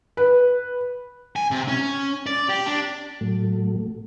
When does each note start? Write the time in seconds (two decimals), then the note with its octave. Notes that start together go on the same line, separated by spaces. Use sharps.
0.17 B4
1.36 G#5
1.51 C3
1.68 C#4
2.26 D5
2.49 G4
2.66 D4
3.21 A2 F#3 A3